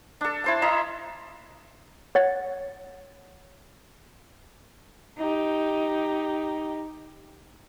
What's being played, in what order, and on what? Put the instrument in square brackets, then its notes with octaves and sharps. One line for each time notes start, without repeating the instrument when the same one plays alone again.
[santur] D4 A4
E4 C5 A5
E4 D#5 E5 A#5
[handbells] C#5 F#5 A6
[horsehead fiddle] D#4 G4